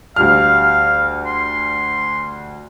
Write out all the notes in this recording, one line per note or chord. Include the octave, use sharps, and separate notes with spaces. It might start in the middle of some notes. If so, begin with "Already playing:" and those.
D2 G3 F5 F6
C6